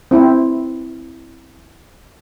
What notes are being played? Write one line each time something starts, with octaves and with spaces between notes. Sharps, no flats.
C4 E4